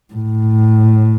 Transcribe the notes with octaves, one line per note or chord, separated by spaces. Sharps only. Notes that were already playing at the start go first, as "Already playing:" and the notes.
A2